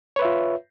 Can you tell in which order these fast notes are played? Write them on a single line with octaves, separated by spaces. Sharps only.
C#5 B4 E5 F4